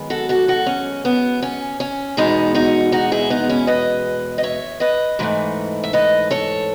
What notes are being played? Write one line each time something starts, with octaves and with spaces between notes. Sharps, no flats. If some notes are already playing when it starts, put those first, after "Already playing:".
Already playing: F#2 D#3 G#3 B3
F#4 A4
F#4 A4
F#4 A4
C#4
B3
C#4
C#4
E2 B2 G#3 B3 D#4
D#4 F#4
D#4 F#4
E4 G#4
B3 D#4
C#4 E4
B4 D#5
D#5
C#5 E5
B4 D#5
G#2 E3 A3
E5
B4 D#5
A4 C#5